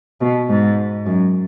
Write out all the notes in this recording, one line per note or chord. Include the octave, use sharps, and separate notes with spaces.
B2
G#2
F#2